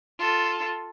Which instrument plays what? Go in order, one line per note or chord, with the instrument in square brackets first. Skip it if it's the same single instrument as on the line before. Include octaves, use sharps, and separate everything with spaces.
[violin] F4 A4